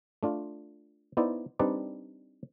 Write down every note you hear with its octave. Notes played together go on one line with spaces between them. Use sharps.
A3 D4 F4
B3 D#4 E4 C5 D5
G3 C4 D4 D#4 B4 D5